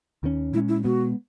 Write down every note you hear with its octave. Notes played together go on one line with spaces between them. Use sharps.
D#2 D#3 G#3 C#4
A#2 G#3 C#4 E4
E4
B2 G#3 B3 F#4